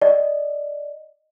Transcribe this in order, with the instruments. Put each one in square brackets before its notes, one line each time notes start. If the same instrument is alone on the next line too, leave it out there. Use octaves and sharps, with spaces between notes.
[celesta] D5 D#5